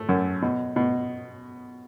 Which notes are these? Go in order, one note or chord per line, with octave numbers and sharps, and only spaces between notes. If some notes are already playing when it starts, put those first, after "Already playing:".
Already playing: A3
F#2
B2
B2